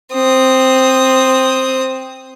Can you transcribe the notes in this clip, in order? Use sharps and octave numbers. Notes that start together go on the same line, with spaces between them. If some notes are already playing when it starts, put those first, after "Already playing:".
C4 D#6